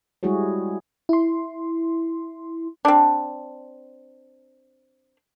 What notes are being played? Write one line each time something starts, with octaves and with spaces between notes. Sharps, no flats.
G3 G#3 E4 F#4 G#4 C#5
E4 C6
C4 D4